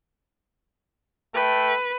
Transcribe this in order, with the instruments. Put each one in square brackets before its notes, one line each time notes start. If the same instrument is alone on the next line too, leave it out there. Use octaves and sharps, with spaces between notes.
[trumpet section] A3 A4 G5 [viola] B4